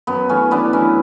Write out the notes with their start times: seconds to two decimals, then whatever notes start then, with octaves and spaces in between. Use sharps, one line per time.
0.07 F#2 B3
0.29 E3 A3 C#4
0.51 E3 B3 D4
0.73 F#2 C#4 E4